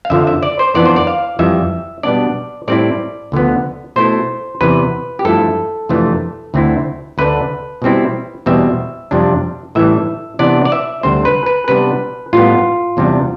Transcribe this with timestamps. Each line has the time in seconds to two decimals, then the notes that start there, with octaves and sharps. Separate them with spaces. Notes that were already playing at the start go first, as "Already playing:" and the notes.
0.05 F5
0.10 F2 D3 F3 E5
0.27 E5
0.43 D5
0.59 C5
0.75 F2 E3 B3 D4 D5
0.86 C5
0.96 D5
1.07 F5
1.39 F2 E3 G3 E5
2.03 B2 G3 B3 D4 D5
2.68 A2 G3 C4 E4 D5
3.32 D2 D3 F3 B3
3.96 B2 A3 E4 C5
4.61 E2 C3 E3 B4
5.19 G4
5.25 G2 F3 A3 E4 A4
5.89 F2 C3 E3 A3 D4
6.54 D2 D3 A3 C4 E4
7.18 D2 D3 A3 D4 B4
7.82 B2 G3 C4 E4
8.46 E2 B2 G3 C4 E5
9.11 F2 C3 G3 D4
9.75 A2 E3 G3 E5
10.39 C3 E3 B3 D4 D5
10.65 D5
10.72 E5
11.03 D2 D3 G3 C4 C5
11.25 B4
11.46 B4
11.68 C3 G3 B3 D4 B4
12.33 A2 G3 B3 F4
12.97 E2 C3 G3 D4